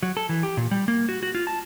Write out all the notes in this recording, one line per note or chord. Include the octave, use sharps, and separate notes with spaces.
F#3
A4
E3
G4
A#2
G3
A#3
F#4
F#4
F4
A5